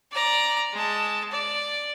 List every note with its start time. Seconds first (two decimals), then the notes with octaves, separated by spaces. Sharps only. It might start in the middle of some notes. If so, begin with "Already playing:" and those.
0.12 D5 A#5
0.73 G#3 A5
1.32 D5